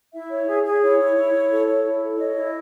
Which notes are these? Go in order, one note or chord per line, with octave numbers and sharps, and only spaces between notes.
E4 E5
C#5
G#4
G#4
E4 C#5
E4
E4
E4
A4
C#5
E4
A4
C#5 D#5
E4